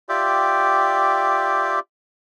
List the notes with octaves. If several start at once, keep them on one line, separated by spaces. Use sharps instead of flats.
F4 G4 D5 E5 G5